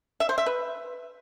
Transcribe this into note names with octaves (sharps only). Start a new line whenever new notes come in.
E5
C5
E5
B4